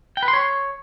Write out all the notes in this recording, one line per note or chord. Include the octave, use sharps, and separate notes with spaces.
G5
B4
C6
C#5